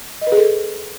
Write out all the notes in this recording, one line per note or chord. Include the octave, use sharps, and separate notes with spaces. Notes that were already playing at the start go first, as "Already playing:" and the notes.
D#5
B4
G#4
A4